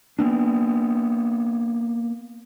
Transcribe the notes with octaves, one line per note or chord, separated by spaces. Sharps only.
A#3 B3 D4